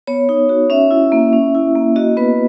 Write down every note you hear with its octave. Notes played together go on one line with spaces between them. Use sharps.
B3 C#5
D#4
F#4
C#4 E5
E4
A#3
C#4
E4
A#3
F#4 D#5
B3 B4